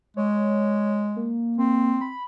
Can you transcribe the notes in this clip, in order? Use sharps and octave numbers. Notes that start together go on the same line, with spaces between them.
G#3 C#5
A#3
A#3 C4
B5